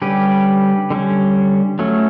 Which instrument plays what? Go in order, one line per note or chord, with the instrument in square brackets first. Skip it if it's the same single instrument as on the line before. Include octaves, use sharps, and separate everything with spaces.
[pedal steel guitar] D3 G3 C#4 G4 B4
D3 G3 C#4
F#3 A3 C#4